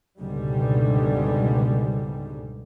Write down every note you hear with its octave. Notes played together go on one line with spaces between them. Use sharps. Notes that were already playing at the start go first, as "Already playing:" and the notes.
C#2 G#2 B2 D3 G3